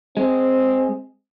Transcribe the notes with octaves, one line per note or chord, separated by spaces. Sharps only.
G#3 C4